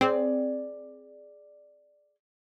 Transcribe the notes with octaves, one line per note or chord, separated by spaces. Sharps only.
C4 G#4 D5